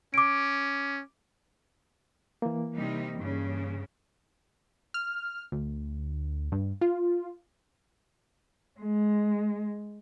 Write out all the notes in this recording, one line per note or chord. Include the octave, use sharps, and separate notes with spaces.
C#4 D6 D7
E3 A#3
C3 G3 D#4
G2 C#3
F6
D2
G2
F4
G#3